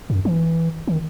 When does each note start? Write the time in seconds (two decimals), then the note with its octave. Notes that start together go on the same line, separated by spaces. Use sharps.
0.10 F#2
0.25 E3
0.87 D#3